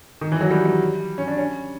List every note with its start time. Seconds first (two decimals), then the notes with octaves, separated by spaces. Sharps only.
0.21 D#3
0.32 E3
0.41 F#3
0.51 G3
0.65 G3
1.18 C#4
1.28 D4
1.37 C#4